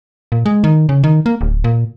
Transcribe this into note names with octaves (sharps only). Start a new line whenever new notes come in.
A#2
G#3
D#3
C#3
D#3
A#3
D1
A#2